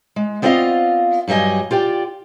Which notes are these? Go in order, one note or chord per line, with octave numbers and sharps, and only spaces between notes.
G#3
B3 C4 F4 D5 D#5 F5
G2 F#3 G3 D#5 G#5
F4 G4 D5 G5